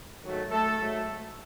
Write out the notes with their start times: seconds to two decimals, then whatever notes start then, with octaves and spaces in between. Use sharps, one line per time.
0.23 G#2 D#3 F#3 A3
0.51 A3 A4
0.79 G#2 F#3 A3